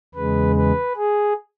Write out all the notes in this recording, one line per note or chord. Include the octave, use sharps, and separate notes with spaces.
E2 C#3 G#3 B4
B4
G#4